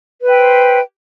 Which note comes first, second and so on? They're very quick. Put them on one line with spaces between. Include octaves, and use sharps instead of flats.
B4 E5 G5 C5